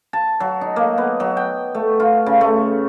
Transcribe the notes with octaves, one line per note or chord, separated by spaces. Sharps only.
A5
F#3
D#4
A#3
B3
F#3
G5
A3
F4
C#3
A3